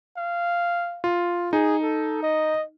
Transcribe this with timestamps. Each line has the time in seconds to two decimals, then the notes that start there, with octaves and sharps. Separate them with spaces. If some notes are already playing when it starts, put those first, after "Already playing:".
0.17 F5
1.04 F4
1.53 D#4 G#4
1.83 A4
2.23 D#5